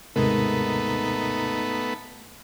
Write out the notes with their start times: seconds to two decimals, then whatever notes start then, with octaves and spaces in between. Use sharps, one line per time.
0.16 D#2 G#2 C3 G#3 A3 B3 D#4 A#4